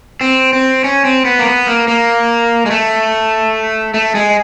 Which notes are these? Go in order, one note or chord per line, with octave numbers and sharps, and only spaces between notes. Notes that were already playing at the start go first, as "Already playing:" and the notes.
C4
C4
C#4
C4
B3
A#3
B3
A#3
A#3
G#3
A3
A3
G#3